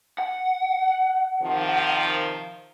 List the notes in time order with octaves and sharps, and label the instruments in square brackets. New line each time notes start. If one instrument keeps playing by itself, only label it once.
[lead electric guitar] F#5
[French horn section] C3 D#3 F3